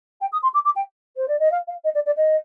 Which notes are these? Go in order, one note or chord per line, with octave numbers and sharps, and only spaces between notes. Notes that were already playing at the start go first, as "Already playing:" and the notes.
G5
D#6
C6
D6
D6
G5
C5
D5
D#5
F5
F5
D#5
D5
D5
D#5